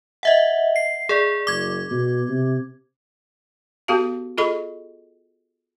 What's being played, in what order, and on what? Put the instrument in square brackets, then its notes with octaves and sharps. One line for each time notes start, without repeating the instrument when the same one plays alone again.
[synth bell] D#5 E5 F#5
C7
G#4 D5
[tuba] F#1 [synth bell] D6 G#6
[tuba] B2
C3
[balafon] B3 F#4 G4 A4 F5 A5
F4 G#4 A4 D#5 B5 C#6